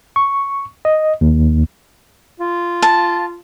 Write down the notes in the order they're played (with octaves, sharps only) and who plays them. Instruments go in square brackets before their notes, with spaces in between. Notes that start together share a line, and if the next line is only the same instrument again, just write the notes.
[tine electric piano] C#6
D#5
D#2
[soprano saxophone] F4
[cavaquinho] A5